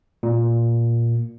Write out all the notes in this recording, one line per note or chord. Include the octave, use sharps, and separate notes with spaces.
A#2